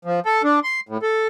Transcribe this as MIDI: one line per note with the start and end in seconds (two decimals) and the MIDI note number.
0.05 0.20 53
0.26 0.42 69
0.44 0.60 62
0.64 0.80 84
0.89 0.98 45
1.02 1.27 69